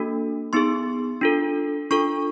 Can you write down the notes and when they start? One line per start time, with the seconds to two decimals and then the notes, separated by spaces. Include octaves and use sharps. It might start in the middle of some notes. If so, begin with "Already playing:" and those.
Already playing: A#3 D4 F#4 A4
0.53 B3 D#4 G#4 C6
1.21 D4 F4 A4
1.91 D4 F4 A4 C#6